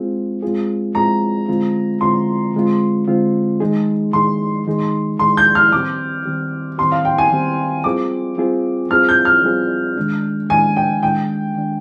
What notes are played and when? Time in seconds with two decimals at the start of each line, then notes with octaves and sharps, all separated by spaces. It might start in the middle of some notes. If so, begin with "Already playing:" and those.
Already playing: G#3 C4 F4 G#4
0.42 G#3 C4 F4 G#4
0.95 G#3 C4 F4 G#4 A#5
1.48 D3 G#3 C4 F4
2.01 D3 G#3 C4 F4 C6
2.54 D3 G#3 C4 F4
3.07 D3 G#3 C4 F4
3.60 D#3 G#3 D#4 G#4
4.13 D#3 G#3 D#4 G#4 C6
4.67 D#3 G#3 D#4 G#4
5.19 D#3 G#3 D#4 G#4 C6
5.37 G6
5.55 F6
5.72 D#3 G3 C4 G4 D6
6.25 D#3 G3 C4 G4
6.78 D#3 G3 C4 G4 C6
6.92 F5
7.05 G5
7.18 G#5
7.31 D#3 G3 C4 G4
7.84 G3 C4 F4 G#4 D6
8.37 G3 C4 F4 G#4
8.90 G3 C4 F4 G#4 F6
9.09 G6
9.25 F6
9.44 G3 C4 F4 G#4
9.97 D#3 G#3 D4
10.49 D#3 G#3 D4 G#5
10.77 G5
11.02 D#3 G#3 D4 G5
11.56 D#3 G#3 D4